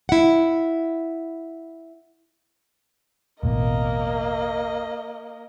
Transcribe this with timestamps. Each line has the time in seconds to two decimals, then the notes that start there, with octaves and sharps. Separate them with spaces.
0.09 E4 F#5
3.43 E1 A1 E2 A#3 D#5